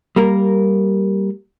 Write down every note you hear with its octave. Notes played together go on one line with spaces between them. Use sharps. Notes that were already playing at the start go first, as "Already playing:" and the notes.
G3 A#3 A#4